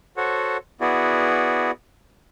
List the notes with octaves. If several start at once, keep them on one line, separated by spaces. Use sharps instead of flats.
F#4 A4 C5 C#5 F#5
B3 E4 F#4 G#4 D5